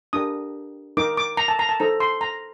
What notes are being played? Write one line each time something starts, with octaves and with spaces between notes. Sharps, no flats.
D4 G4 A#4 D#6
D#4 A#4 D6
D6
A#5
A5
A#5
A5
D#4 A4 C5 A#5
C6
A#5